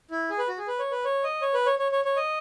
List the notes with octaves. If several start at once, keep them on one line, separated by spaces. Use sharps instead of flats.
E4
G#4
B4
F#4
G#4
B4
C#5
B4
C#5
D#5
C#5
B4
C#5
C#5
C#5
C#5
D#5